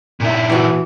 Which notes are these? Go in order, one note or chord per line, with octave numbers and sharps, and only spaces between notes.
A#2 E4
E3 F#4